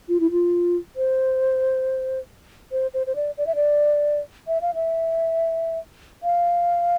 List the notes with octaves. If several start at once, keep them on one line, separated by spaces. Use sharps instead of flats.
F4
E4
F4
C5
C5
C5
C5
D5
D5
E5
D5
E5
F5
E5
F5